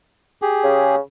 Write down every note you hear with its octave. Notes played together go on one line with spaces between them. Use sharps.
G4 G#4
C#3